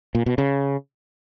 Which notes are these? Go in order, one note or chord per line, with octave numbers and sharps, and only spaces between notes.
A#2
B2
C#3